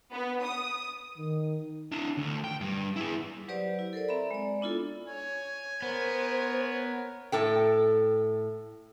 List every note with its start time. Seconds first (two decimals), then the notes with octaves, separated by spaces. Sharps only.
0.13 B3
0.43 D#6
1.17 D#3
1.92 D4 E4
2.17 D2
2.44 G5
2.61 G2 G3
2.96 E4 G#4
3.48 F#3 G4 B4 C5 D5
3.79 E4
3.93 A4 A#4 C5 D5
4.08 C4 D5 E5 A#5 B5
4.31 G#3 D5
4.61 B3 D4 E4 F4 A4
5.08 C#5 G#5
5.82 B3 A#4 C5 C#5
7.32 A2 A4 G5